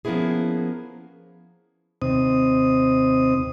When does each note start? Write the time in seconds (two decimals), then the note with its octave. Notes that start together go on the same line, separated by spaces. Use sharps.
0.05 F3 A#3 B3 C#4 E4 G#4
2.02 D#2 C3 C4 D#6